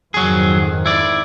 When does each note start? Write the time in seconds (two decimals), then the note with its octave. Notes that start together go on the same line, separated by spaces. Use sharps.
0.14 F2 G#2 D#3 F#3 G#4
0.86 E4 D5